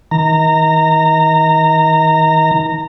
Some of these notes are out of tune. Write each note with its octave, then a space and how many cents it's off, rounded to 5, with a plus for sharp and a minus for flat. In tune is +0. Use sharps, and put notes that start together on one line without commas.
D#3 +35 A#5 -20